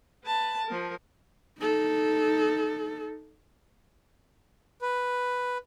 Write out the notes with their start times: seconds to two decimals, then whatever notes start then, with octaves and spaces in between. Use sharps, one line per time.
0.24 B4 A5
0.66 F3 A#4
1.59 D#4 A4
4.82 B4